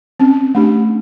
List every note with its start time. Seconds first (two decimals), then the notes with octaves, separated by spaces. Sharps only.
0.20 C4 C#4
0.55 A3 D4 G4